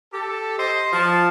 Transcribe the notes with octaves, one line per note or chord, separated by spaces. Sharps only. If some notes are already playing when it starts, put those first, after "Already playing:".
G4 A4
C5 D#5
F3 A5